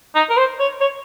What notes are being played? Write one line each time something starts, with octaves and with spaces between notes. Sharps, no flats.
D#4
A#4
C5
C#5
C#5